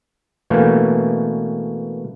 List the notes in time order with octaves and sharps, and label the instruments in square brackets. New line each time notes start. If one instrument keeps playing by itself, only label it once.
[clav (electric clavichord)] B2 E3 A3 A#3 C#4